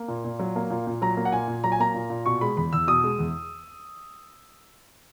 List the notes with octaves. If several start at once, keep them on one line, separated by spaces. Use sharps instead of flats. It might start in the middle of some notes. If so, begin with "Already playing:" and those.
Already playing: A#3
A#2
A#2
F#3
A#3
A#2
A#2
F#3 A#5
A#3
F#5
A#2 G#5
A#2
F#3 A#5
G#5
A#3 A#5
A#2
A#2
B2 C#6
G#3 B5
E2 B5
E2 E6
B2 D#6
G#3
E2